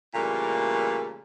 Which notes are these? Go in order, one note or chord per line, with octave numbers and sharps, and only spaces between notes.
A#2 C#3 E3 G3 A3 A#3